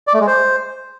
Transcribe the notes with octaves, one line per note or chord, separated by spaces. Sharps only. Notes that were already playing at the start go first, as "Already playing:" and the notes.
D5
A3
G#3
C5